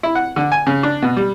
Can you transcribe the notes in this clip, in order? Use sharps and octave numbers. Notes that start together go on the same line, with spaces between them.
E4
F#5
D3
G#5
C#3
D4
B2
G3